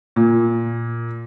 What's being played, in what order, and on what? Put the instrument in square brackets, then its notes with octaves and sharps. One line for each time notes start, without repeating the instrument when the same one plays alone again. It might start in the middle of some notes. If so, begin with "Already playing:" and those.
[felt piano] A#2